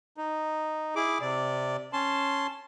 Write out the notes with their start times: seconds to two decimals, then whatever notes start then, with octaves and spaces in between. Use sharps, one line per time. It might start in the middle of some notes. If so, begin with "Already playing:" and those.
0.17 D#4
0.96 E4 G#4 D6
1.21 C3 D5
1.93 C#4 A5 C6